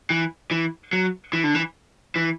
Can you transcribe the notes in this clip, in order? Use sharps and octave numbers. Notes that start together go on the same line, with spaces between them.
E3
E3
F#3
E3
D3
E3
E3